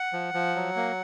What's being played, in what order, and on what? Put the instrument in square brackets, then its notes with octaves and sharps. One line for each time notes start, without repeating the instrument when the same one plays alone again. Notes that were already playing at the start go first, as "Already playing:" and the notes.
Already playing: [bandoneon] F#5
F3
F3
F#3
A#3